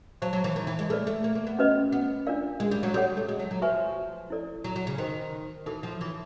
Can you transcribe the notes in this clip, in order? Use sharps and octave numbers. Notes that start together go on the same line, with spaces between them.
F#3 C5 F5 A5 C#6
F#3
E3
D#3
E3
G#3
A3 G#4 B4 D5
A3
A#3
A#3
B3
C#4 F#4 B4 D#5
B3
D4 F4 A#4 D5 F5
G#3
G3
F#3
G3 F#4 A4 C#5 F#5
A3
G#3
F#3
F#3
F3 F#4 B4 E5 G#5 C#6
E4 A4 D5
F#3
F#3
C#3
D#3 C5 D#5 G5 C6
E3 D#4 F#4 A4
F3
E3